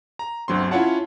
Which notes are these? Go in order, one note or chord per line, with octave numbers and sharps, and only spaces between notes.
A#5
G1 D2 F#3 C4 C6
C#4 E4 F4 C#5 F#5 A5